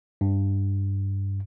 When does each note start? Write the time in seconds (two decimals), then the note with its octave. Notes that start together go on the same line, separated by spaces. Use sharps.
0.21 G2